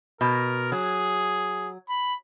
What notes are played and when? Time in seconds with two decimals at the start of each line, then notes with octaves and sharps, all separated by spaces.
0.21 B2 A#4
0.72 F#3 G#4
1.89 B5